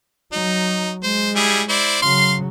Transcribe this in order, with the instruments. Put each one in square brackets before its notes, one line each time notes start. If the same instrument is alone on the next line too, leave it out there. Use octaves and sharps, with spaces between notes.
[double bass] F#3 [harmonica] D#4
[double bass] G#3 [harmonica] C5
[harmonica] G3 E4 G#4
E4 C5 D5
[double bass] C#3 F#3 [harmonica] F5 C6